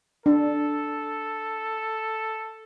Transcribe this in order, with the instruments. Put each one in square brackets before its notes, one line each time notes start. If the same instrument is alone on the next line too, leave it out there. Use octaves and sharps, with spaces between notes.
[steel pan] D4 [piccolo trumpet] A4